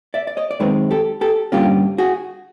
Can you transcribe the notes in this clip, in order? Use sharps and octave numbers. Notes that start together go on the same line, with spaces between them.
D5 E5
D5
C#5 D#5
D5
F#2 D#3 G#3 C4 B4 C#5
G4 A4
G4 A4
G2 D3 G3 A#3 C#4 F4 G4
F#4 G#4